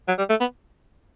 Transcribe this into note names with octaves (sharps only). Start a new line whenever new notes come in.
F#3
G3
A3
B3